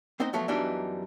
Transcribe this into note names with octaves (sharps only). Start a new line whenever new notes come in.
B3 C4 D#4 C5 D#5
F3 F#3 A3 B3
F#2 E3 G3 B3 D4 D#4